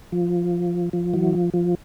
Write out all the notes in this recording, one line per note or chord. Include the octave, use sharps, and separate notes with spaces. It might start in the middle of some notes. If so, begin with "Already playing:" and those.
F3
F3
E3 F#3
F3
F3